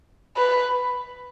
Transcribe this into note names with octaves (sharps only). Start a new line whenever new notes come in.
B4